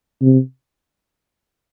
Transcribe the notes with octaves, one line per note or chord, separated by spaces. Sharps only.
C3